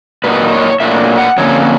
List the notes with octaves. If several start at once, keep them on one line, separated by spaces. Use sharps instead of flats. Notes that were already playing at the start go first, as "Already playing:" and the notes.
A#2 F#3 A#3 D#4 B4
C#5
A#2 F#3 A3 D4 E5
F#5
F2 D3 F#3 A#3 C#4 C#5